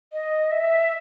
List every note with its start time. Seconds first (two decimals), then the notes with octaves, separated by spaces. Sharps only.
0.13 D#5
0.52 E5